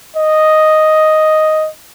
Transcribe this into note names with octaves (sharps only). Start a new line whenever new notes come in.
D#5